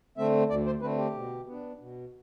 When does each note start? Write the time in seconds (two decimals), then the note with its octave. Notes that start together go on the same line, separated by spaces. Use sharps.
0.17 D3 A3 C4 E5
0.49 D2 D5
0.66 C5
0.81 D3 A3 C4 B4
0.98 G4
1.14 B2
1.46 B3
1.51 D4
1.79 B2